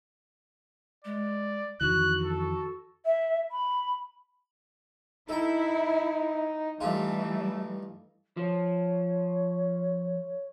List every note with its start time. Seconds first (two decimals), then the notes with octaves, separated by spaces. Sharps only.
1.05 G#3 D5
1.81 F2 D#3 E3 F#4 F#6
2.24 A4
3.06 E5
3.52 B5
5.29 D#4 E4 A4 G5
6.81 G2 E3 G3 A3 D#4 F4
8.37 F3 C#5